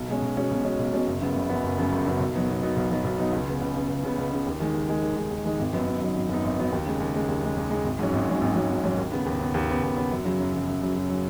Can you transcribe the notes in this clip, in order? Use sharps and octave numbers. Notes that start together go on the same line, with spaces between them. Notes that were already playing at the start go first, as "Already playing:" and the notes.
Already playing: B1
B2 G#3 C#4
B1
B2 G#3 C#4
B1
B2 G#3 C#4
B1
B2 G#3 C#4
F#1
F#2 C#3 B3
F#1
F#2 C#3 B3
F#1
F#2 C#3 B3
F#1
F#2 C#3 B3
B1
B2 F#3 B3 D#4
B1
B2 F#3 B3 D#4
B1
B2 F#3 B3 D#4
B1
B2 F#3 B3 D#4
C#2
C#3 B3
C#2
C#3 B3
C#2
C#3 B3
C#2
C#3 B3
D#2
D#3 G#3 D#4
D#2
D#3 G#3 D#4
D#2
D#3 G#3 D#4
D#2
D#3 G#3 D#4
G#1
F#2 F#3 B3 D#4
G#1
F#2 F#3 B3 D#4
G#1
F#2 F#3 B3 D#4
G#1
F#2 F#3 B3 D#4
D#2
C#3 G#3
D#2
C#3 G#3
D#2
C#3 G#3
D#2
C#3 G#3
G#1
G#2 F#3 C#4
G#1
G#2 F#3 C#4
G#1
G#2 F#3 C#4
G#1
G#2 F#3 C#4
D#2
C#3 B3
D#2
C#3 B3
D#2
C#3 B3
D#2
C#3 B3
F#2
C#3 F#3
F#2
C#3 F#3
F#2
C#3 F#3
F#2
C#3 F#3